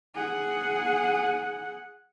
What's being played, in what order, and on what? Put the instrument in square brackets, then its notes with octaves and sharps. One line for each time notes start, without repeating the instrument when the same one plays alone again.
[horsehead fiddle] G#4 F#5